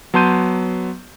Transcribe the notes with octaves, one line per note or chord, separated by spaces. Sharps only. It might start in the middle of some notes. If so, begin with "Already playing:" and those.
F#3 B3 A5 C6 G6 D#7